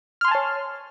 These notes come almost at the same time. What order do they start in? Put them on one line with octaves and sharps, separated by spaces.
F6 C6 G#5 A5 C#5